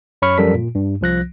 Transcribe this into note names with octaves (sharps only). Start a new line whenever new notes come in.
F#2 C#5 B5 C#6 F6
F#2 F3 G3 A4 A#4 B6
A#2
G2
C2 F3 F#6 A#6